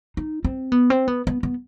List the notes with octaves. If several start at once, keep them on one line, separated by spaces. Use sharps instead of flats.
D#4
C4
B3
C4
B3
B3
B3